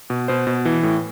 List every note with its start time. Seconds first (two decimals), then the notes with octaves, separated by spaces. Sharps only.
0.10 B2
0.28 B2 C5
0.47 B2
0.65 E3
0.83 A2